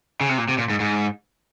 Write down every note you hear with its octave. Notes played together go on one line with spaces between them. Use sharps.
C#3
C3
A#2
C3
A#2
G#2
G#2